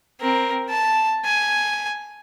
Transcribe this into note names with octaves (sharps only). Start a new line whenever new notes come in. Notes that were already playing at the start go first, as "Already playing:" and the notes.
C4 A#4
A5
G#5